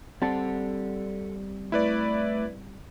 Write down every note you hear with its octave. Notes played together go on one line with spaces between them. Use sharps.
G3 C4 A4 D5 F#5 A5
A3 E4 B4 D5